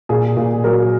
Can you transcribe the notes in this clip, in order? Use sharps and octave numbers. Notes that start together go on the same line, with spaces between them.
A#2 G#4
A#2
F#3 A#4